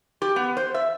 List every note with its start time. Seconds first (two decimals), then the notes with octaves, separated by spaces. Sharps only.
0.22 G4
0.36 B3
0.57 C5
0.74 E5